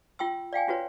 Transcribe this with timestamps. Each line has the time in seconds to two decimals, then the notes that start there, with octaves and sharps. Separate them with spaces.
0.19 F4 G5 C6 E6
0.53 D5 F5 G5 G#5
0.68 C#4 F4 F#4 B4 C#5